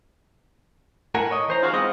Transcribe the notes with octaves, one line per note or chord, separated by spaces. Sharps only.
A2 A#4 F#5 G#5
C#5 D#5
E3 C5 A#5
D#4 F4 F#4 G#4 C5 F5
G#3 B3 C4 F4 D#5